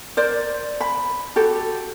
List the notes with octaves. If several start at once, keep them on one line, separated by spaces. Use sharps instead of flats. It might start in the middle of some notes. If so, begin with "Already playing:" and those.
A#4 C5 D5
B5
F#4 G4 A4